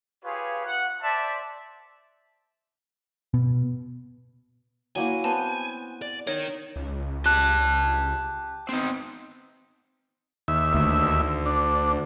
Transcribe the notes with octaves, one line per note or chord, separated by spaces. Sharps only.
F4 G4 G#4 B4 C#5 F5
F#5
C5 D5 E5 A5
B2
F#3 A#3 E4 G#5
B3 C4 C5 A5
D5
D#4 A#4 C#5
C#2
G4 A5 F#6
B3 C4 D#4
D#2 E5
D2
D4